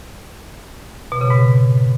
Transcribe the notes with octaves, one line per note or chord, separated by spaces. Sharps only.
B2
C#3
G#2